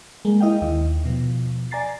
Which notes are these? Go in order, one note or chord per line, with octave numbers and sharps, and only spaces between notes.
G#3 A#3
E4 D#5 F5 G5
D#2 D#3
B2 F3
D5 G#5 A#5 A6 C7